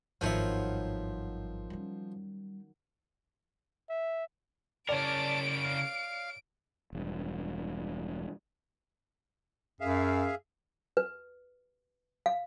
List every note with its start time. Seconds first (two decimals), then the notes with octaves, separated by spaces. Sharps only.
0.21 G#1 G2 D#3 F3 F#3 B3 C5 E5
1.70 G3 C#4
3.90 E5
4.89 C#3 A#4 C#5 D5 A5 D7
5.64 F5
6.93 E1 G2
9.81 F#2 G#4 E5 F5
10.97 B4
12.26 F5